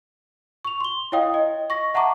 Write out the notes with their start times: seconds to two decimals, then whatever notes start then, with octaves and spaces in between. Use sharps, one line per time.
0.65 C#6 F7
0.80 C6 G7
1.12 E4 C#5 D#5 F5 G5 D#6
1.34 D#5
1.70 C#6 A#6
1.94 E5 F#5 A5 A#5 C#6 D6